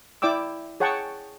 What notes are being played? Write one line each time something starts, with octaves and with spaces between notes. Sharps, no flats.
E4 D5 G5 D6 E6
G#4 C#5 F#5 G5 A5 C#6